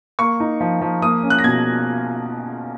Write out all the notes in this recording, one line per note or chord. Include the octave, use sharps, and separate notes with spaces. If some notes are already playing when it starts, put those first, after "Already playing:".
A#3 C#6
D#4
F3
F3
A#3 D#6
C#4
F#6
A#6
B2 G#6